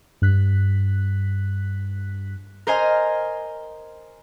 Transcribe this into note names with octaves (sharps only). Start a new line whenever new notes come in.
G2 F#6 B6
A#4 C5 D#5 G#5 F6